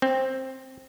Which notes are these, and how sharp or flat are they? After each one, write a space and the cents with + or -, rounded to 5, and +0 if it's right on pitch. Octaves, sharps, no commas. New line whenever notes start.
C4 +10